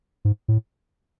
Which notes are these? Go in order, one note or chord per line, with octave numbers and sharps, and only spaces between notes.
G#2
A2